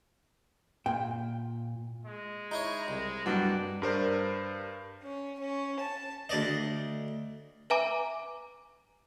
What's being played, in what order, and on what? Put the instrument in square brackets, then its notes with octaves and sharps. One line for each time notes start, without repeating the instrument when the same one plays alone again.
[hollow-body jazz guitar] A#2 G5
[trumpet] G#3
[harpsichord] D#4 E4 C#5
C2
[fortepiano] G2 F#3 [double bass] G3 [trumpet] D5
[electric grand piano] G2 A#4 C5 D5
[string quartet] C#4
C#4
A5
[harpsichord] D2 D5 D#5
[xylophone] B4 E5 G#5 A#5 D6